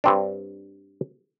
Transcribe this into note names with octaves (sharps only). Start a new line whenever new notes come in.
G2 C4 D4